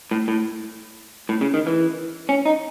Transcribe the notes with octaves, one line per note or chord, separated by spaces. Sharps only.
A2
A2
A2
C#3
D#3
E3
C#4
D#4